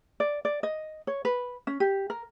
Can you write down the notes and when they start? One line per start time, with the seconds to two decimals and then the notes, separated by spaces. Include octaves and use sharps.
0.20 D5
0.45 D5
0.63 D#5
1.07 C#5
1.25 B4
1.67 C#4
1.80 G4
2.10 A#4